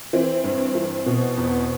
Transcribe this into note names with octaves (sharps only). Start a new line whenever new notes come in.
E3 C4
G2
E3
B2
E2